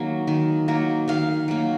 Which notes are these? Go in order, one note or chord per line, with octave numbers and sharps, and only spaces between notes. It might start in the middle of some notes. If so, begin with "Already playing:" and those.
Already playing: D#3 F#3 A#3
D#3
F#3 A#3
D#3 F5
F#3 A#3